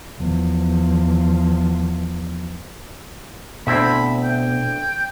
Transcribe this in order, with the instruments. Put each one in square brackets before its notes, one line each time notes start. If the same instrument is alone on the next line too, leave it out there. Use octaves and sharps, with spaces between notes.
[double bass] E2 F3
[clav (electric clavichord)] D2 C4 E4 [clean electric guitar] B2 E5 [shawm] B5
[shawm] G5